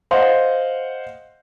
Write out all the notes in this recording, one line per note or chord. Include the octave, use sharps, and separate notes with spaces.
C5 D#5 F5 F#5 C6